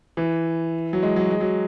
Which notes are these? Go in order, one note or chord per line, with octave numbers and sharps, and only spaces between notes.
E3
F#3
G#3
F#3
G#3
F#3